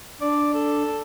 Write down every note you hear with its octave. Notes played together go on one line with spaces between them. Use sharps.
D4 D5
A4